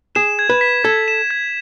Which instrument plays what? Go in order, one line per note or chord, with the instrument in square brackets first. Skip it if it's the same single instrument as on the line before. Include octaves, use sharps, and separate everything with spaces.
[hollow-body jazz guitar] G#4 [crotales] E7
[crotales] G#6
[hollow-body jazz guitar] B4
[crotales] B6
[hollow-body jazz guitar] A4 [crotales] G#6
[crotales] E7
G#6